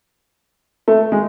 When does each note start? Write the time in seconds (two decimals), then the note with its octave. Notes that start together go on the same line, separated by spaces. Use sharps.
0.88 A3
1.12 G#3